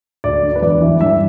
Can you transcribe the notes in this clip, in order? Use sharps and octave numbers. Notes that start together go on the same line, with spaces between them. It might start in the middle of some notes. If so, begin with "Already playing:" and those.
D2 D5
D3
B4
E2 D5
E3
G2 E5